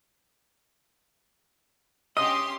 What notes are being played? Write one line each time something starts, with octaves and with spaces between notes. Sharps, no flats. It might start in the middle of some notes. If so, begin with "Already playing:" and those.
C#4 G4 D#5 C6 D#6